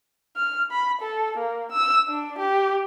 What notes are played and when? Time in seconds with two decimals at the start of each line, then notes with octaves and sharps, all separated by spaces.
0.36 F6
0.72 B5
1.02 A4
1.38 A#3
1.72 E6
2.09 D4
2.39 G4